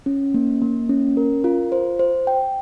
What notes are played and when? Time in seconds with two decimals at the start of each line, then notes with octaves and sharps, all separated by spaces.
0.06 C#4
0.34 A#3
0.62 A#3
0.89 C#4
1.17 A#4
1.44 F4
1.72 C5
1.99 C5
2.27 G5